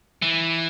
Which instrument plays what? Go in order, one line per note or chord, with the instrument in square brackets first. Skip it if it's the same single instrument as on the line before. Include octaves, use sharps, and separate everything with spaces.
[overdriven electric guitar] E3